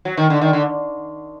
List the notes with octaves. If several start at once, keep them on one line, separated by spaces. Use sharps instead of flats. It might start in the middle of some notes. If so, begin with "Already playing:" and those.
F#3
D#3
D3
D#3
D3